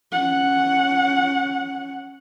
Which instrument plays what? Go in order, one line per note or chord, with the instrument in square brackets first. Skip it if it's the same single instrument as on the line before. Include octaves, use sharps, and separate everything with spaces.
[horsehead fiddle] C#4 F#5